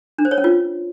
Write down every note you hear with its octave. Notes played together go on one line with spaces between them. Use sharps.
D4
C5
C#5
C#4
F4